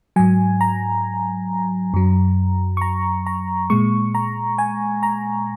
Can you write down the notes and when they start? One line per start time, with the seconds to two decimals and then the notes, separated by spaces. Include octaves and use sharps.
0.16 G#2 F#3 G#5
0.61 A#5
1.94 F#2 F#3
2.77 C#6
2.81 A#5
3.27 A#5
3.70 A#2 G#3 C#6
4.15 A#5
4.58 G#5
5.03 A#5